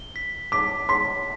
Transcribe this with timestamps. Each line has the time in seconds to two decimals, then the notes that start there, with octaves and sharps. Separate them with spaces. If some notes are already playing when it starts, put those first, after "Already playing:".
Already playing: G7
0.16 B6
0.52 D6 B6
0.89 C6 B6